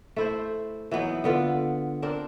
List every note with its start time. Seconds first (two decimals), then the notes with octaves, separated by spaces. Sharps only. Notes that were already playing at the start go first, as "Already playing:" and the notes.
0.16 A3 E4 C5
0.91 E3 F#3 B3 D#4
1.24 D3 B3 F4
2.02 C4 D4 A#4